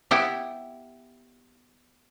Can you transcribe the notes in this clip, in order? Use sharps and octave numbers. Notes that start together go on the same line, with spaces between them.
B3 E4 G4